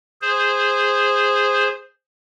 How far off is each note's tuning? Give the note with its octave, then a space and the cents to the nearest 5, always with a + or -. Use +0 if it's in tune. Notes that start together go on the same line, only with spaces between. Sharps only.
G#4 -10 C5 +0